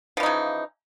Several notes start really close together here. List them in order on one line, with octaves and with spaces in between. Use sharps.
F3 E3 D#4 C#3